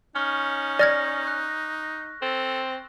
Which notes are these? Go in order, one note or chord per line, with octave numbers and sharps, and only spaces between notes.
C#4 D#4 C#6 F6
D5 F6 G#6 A#6
F#6
C4 A4